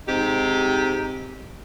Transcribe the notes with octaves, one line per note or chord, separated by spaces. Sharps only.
G#2 C3 D#4 G4